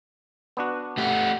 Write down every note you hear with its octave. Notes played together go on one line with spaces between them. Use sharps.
B3 D4 F#4
A3 G4 F#5